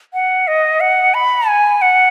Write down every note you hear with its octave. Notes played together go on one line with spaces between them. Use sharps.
F#5
D#5
F#5
B5
G#5
F#5